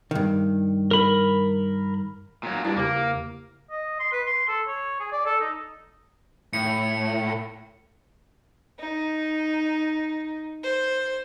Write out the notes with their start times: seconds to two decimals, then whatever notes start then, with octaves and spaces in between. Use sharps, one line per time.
0.11 G2 D#3
0.91 A#4 B5
2.43 A#2 F#3
2.65 G2 D4 E4 G4
2.76 E2 C#3 A#3 G4
3.70 D#5
4.00 C6
4.12 B4
4.27 C6
4.48 A4
4.68 C#5
5.00 G#4
5.12 D5
5.25 A4
5.40 D#4
6.53 A2 C#7
8.79 D#4
10.64 C5